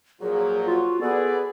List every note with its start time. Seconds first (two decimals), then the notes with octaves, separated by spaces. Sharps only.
0.21 A#2 F3 F#3 G#4
0.67 F4 F#4
1.02 B3 G#4 A4 B4 D5